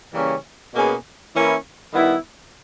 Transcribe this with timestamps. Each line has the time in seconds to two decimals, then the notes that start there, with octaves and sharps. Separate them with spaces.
0.14 C#3 E3 G3 A#3 C#4
0.74 B2 A#3 C#4 G#4 B4
1.34 E3 A#3 C#4 E4 A#4
1.94 D#3 G3 B3 E4